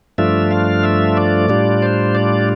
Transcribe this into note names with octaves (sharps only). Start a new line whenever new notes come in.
G2 F3 A3 D4 F4 E5
F5
E5
D5
A2 G3 D4 F4
C5
D5